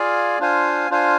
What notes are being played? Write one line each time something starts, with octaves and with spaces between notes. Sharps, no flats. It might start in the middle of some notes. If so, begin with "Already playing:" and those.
Already playing: F4 G#4 D5 F5 G#5
D4 F4 C5 F5 G#5
D4 F4 C5 F5 G#5